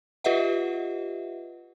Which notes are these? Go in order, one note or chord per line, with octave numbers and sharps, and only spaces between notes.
F4 G4 B4 D#5 E5 F#5